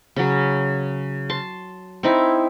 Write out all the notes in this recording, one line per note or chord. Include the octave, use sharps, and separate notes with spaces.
C#3 F#3
A5 C6
C4 D#4 E4